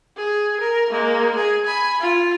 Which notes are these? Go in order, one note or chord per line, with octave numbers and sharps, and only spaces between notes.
G#4
A#4
G#3 A#3
G#4
G#5 B5
F4